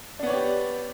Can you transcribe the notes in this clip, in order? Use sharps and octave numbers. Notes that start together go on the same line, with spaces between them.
B3 D4 G4 C#5 D5